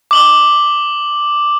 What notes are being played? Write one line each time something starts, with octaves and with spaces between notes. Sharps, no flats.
D6 F#7 G7